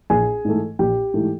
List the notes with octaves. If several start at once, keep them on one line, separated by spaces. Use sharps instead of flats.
A#1 G#4 G#5
G#2 E3 A3
A#1 G4 G5
G#2 E3 A3